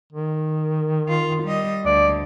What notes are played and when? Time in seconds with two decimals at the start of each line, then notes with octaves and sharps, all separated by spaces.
0.13 D#3
1.09 F4
1.44 G3 D#5
1.85 D2 D5